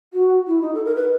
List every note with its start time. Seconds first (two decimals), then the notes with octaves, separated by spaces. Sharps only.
0.13 F#4
0.47 E4
0.62 D#4
0.75 A4
0.85 A#4
0.96 B4